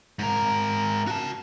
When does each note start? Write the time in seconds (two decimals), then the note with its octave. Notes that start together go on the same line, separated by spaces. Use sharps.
0.19 G#2 A#4
1.07 F#4 A5